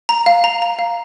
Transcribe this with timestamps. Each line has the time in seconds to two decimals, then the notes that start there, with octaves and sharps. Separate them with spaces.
0.09 A#5
0.26 F5
0.44 A#5
0.62 A#5
0.79 F5